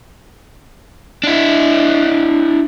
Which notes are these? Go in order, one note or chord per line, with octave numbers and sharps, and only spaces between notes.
D4 E4